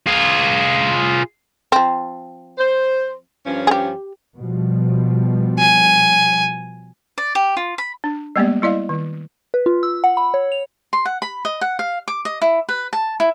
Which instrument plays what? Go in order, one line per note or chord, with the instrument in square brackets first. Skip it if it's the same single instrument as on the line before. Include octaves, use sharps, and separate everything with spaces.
[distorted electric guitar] F4 G#4
[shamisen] F3 C4
[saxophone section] C5
G2 F3 C#4
[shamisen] G4 G#4
[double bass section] B2 F3 G3
[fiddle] G#5
[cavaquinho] D5
G4
F4
B5
[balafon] D4
G3 G#3 A#3 B3 G4 D5
G3 E4 D5 D#5 F5
D#3
[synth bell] B4
F4
E6
F#5
B5
C#5
F7
[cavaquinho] C6
F#5
B5
D#5
F#5
F5
D6
D#5
E4
B4
A5
E4